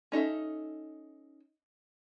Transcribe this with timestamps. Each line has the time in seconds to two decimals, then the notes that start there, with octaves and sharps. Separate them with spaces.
0.12 C#4 D#4 A4 E5